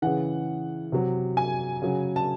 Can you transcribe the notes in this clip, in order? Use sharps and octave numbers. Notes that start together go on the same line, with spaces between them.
C#3 E3 F#5
C3 F#3
G#5
C#3 F#3
A5